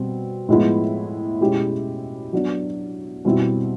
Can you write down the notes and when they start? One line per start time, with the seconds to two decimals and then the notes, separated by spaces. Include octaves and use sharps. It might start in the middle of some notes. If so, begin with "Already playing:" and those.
Already playing: B2 G3 C4
0.49 A2 F3 G#3 B3 E4
1.41 B2 G#3 C#4 E4 G4
2.33 F#3 B3 D4
3.25 B2 G3 C4 E4